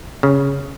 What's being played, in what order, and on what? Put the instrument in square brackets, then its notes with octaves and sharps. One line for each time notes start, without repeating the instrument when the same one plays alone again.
[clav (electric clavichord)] C#3